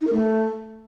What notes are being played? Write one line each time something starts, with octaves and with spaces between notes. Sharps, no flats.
D#4
A#4
A3